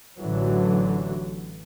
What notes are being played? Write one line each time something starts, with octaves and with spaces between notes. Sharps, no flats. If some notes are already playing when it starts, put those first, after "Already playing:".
A1 D3 E3 F#3